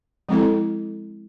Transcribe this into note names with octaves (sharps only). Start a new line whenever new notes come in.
F3 G#3 C4 E4 A4